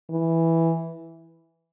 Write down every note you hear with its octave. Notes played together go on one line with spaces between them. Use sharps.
E3